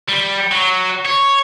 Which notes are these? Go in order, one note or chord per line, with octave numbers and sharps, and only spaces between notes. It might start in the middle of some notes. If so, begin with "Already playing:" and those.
G3
F#3
C#5